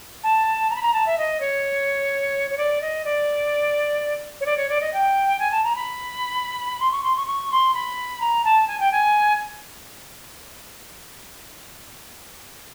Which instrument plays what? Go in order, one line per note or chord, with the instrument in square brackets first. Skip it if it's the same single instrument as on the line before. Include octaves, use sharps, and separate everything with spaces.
[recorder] A5
A#5
B5
A#5
A5
E5
D#5
C#5
C#5
D5
D#5
D5
C#5
D5
C#5
D5
D#5
G5
G#5
A5
A#5
B5
C6
C#6
C6
C#6
C#6
C6
B5
A#5
A5
G#5
G5
G#5